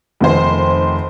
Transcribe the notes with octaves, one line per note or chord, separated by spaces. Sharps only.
F1 D#3 C5